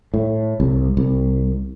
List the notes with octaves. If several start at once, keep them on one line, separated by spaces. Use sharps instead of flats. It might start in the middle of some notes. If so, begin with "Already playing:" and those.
A2
C2
C2